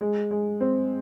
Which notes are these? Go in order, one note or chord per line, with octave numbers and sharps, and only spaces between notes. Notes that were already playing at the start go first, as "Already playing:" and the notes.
G#3
G#3
C4